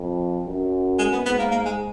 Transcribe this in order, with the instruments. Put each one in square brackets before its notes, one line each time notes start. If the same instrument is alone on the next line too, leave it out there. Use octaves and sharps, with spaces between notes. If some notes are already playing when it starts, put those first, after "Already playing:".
Already playing: [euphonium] F2
F#2
[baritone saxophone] G#3
B3
[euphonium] G#2 [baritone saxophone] B3
[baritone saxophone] A#3
A#3
G#3